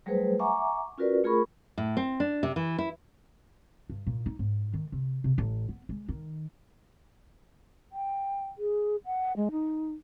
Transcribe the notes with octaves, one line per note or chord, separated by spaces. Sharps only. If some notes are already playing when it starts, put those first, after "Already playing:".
F#3 G3 A3 G#4 B4 C5
E5 F#5 G#5 A#5 C#6 D6
C#4 F4 F#4 A#4 B4 D5
A3 F4 G#4 A#4 B5 C#6
A2
C4
D4
C3
E3
E4
G2
A#2
D#4
G#2
D#3
C3
C3
A1
B3
G#3
D#3
G5
G#4
F#5
G#3
D#4